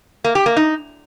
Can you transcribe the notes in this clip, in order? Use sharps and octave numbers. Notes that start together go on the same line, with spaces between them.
A#3
G4
A#3
D#4